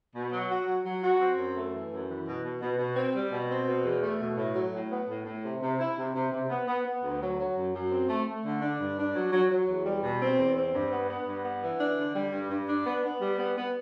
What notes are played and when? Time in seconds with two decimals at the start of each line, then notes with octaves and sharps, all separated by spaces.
0.14 B2
0.31 F#3
0.49 F#4
0.67 F#3
0.84 F#3
1.02 F#4
1.20 C4
1.37 F#2
1.55 A3
1.72 E3
1.90 F#2
2.08 E3
2.26 B2
2.43 B2
2.60 B2
2.78 B2
2.96 C4
3.14 G3
3.31 B2
3.49 C4
3.67 B2
3.84 E2
4.02 A3
4.19 B2
4.37 A2
4.55 F#3
4.73 A2
4.90 B3
5.08 A2
5.26 A2
5.43 C3
5.61 C3
5.79 E4
5.97 C3
6.14 C3
6.32 C3
6.49 B3
6.67 B3
6.85 B3
7.03 D2
7.20 F#3
7.38 F#3
7.55 F#2
7.73 F#2
7.91 C4
8.08 A3
8.26 A3
8.44 D3
8.61 D4
8.79 G2
8.97 D4
9.14 F#3
9.32 F#3
9.50 F#3
9.67 E2
9.85 G3
10.03 B2
10.20 C4
10.38 E2
10.56 C4
10.73 G2
10.91 B3
11.09 B3
11.26 G2
11.44 B3
11.62 E3
11.79 D4
11.97 D3
12.14 G3
12.32 G2
12.50 G2
12.68 D4
12.85 B3
13.03 B3
13.21 G3
13.38 B3
13.56 B3